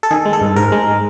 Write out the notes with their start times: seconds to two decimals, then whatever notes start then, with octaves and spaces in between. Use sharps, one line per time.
0.03 A4
0.11 D#3 G#4
0.25 G#3
0.33 A4
0.41 G2
0.56 G#2 A#4
0.72 G#3